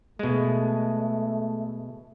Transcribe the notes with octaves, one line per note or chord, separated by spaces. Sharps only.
B2 G#3 A3